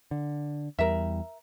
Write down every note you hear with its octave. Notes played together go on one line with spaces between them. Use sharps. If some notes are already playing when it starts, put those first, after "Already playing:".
D3
E2 G3 A#4 E5